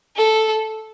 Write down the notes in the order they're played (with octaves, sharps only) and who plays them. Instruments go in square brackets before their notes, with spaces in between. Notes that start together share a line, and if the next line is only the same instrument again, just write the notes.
[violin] A4